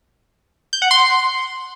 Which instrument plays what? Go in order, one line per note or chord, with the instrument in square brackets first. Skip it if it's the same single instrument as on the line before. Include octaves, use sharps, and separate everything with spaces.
[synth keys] G6
F#5
C6